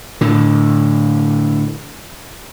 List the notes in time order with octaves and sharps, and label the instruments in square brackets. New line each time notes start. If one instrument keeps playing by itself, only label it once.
[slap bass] A2 D3